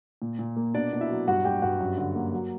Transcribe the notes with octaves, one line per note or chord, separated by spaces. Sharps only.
A#2
A#2
A#3
B2 D4 D5
B2
E4 E5
F#3
G2 F#4 F#5
G2 G4 G5
G2 F#4 F#5
F#2
D3
A#3
F#3